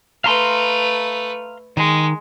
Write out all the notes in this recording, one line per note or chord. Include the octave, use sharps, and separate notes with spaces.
A3 B4 F5 A#5 C6
D#3 G#3